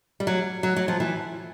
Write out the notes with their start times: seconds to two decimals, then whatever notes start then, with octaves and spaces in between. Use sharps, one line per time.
0.20 G3
0.27 F#3
0.63 F#3
0.76 F#3
0.88 F3
1.00 E3